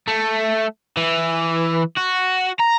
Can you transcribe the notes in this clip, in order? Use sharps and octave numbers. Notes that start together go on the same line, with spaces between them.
A3
E3
F#4
A#5